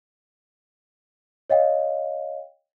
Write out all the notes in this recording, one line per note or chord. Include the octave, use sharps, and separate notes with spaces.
C#5 D#5 F5 G5